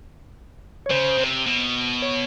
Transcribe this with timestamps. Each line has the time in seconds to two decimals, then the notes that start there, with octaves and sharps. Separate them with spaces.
0.86 C#5
0.90 C#3 C5
1.18 C3
1.47 B2
2.02 C#5